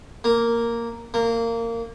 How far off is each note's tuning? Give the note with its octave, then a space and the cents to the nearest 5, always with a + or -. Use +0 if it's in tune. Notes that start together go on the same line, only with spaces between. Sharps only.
A#3 -5
A#3 -20